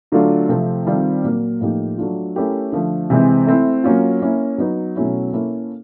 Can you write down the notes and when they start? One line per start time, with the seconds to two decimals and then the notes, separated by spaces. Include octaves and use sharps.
0.12 D3 F#3 A3 D4 F4
0.49 C3 F3 A3 C4
0.86 D#3 G3 C4 F4 A4
1.24 A#2 F#3 A#3
1.61 A2 F3 A#3 D#4 G4
1.98 F#3 A3 D4 F4
2.36 A3 C#4 E4 G4 A#4
2.72 D3 F3 A3
3.10 C3 E3 G#3 C4
3.47 A3 C4 E4
3.84 F#3 A#3 C#4 F4
4.22 A#3 C#4 E4
4.58 F#3 B3 D#4
4.96 B2 F#3 A3 C#4 E4
5.33 A#3 C#4 E4 A4 C#5